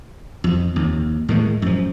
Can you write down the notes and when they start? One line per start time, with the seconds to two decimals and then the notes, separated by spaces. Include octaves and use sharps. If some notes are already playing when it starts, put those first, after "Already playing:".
0.44 F2
0.76 D#2
1.28 A2 D#3 G#3
1.62 F#2 F3